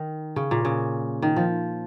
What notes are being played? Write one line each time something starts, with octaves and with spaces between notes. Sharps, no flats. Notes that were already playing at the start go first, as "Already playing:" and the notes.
Already playing: D#3
C#3
A#2
C#3
D#3
F3